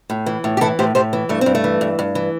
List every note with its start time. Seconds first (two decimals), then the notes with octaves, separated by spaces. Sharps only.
0.10 A2
0.26 E3
0.44 A2
0.57 G4
0.61 E3 E4 A4
0.79 A2 G4 C5
0.95 A2 G4 C5
1.13 E3
1.29 G2 A3
1.41 G2 C4
1.55 A3
1.64 E3
1.81 G2
1.99 G2
2.15 E3